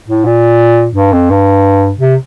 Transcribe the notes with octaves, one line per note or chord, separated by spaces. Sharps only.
A2
A#2
G2
F2
G2
C3